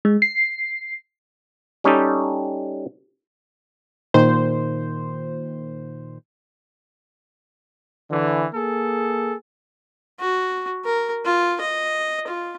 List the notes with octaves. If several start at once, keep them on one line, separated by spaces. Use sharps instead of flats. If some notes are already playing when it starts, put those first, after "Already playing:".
G#3
C7
G3 C#4 D#4 G4 A4
A#2 D#3 C5
D3 E3
A#3 G#4 A4
F#4
A#4
F4
D#5
F4